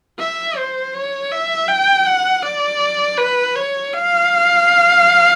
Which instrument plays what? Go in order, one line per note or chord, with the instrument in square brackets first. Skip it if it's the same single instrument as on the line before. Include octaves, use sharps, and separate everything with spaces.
[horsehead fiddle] E5
C5
C#5
E5
G5
F#5
D5
B4
C#5
F5